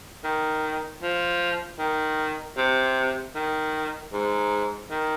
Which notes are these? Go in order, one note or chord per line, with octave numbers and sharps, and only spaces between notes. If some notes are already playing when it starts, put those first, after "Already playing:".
D#3
F3
D#3
C3
D#3
G#2
D#3